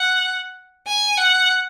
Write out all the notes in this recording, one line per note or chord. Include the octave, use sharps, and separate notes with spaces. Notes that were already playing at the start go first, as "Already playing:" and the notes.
Already playing: F#5
G#5
F#5